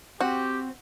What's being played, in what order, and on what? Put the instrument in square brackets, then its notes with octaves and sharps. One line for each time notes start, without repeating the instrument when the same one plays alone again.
[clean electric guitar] C4 [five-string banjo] F#4 [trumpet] G4